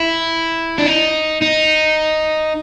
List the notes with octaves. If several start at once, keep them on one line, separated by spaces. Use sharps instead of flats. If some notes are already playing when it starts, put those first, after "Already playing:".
Already playing: E4
D4
D#4
D#4